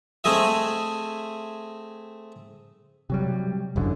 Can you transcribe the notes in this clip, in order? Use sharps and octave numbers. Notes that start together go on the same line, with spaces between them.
A3 C4 G#4 D#5 E5
C3 F#3 G3
F#1 C2 F#2 D3